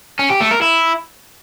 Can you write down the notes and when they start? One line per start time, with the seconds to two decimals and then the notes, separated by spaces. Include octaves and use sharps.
0.19 C#4
0.30 G4
0.40 A3
0.51 A#4
0.62 E4